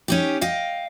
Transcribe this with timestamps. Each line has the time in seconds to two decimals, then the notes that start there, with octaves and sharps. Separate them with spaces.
0.08 C#4 D#4 G4
0.41 D#5 F5 G5